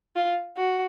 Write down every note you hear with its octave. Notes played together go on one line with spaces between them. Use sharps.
F4
F#4